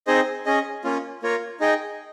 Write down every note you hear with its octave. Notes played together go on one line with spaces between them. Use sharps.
C4 D#4 G#4 C5 D#5
C#4 G#4 D#5
A#3 C#4 F4
A#3 F4 A#4 C#5
D#4 G#4 D#5 G5